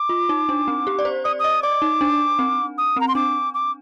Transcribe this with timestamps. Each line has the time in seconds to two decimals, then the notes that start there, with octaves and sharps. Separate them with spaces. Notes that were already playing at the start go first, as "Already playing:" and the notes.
Already playing: D6
0.09 F4
0.29 D#4
0.49 D4
0.68 C4
0.87 G4
0.99 D5
1.05 C5
1.24 D5 D#6
1.39 D#5 D#6
1.63 D5 D6
1.82 D#4
2.01 D4
2.39 C4
2.78 D#6
2.96 C4 A#5
3.08 C6
3.15 D4 D6
3.54 D6